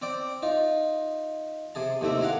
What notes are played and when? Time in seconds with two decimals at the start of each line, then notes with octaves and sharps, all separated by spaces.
0.02 C4 D5 G5
0.43 D#4 F4
1.75 C3 G#4 A5
2.01 D#2 A2 C3 A3 C4 E5
2.21 G#4 A#4 F5 F#5